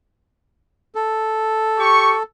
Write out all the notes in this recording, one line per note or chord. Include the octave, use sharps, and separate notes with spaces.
A4
G4 C#6